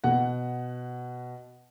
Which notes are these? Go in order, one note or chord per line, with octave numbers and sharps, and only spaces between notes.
B2 F#5